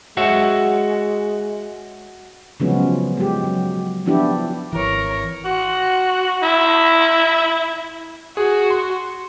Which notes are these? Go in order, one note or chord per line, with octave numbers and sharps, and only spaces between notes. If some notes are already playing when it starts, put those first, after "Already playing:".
G#3 F#4 C#5 E5
C#3 F3 F#3 G#3 B3 C#4
G#3 G4
F#3
F3 B3 D4 E4 G4
G#1 E3 A#4 C#5
F#4
E4
F#4 G#4
C6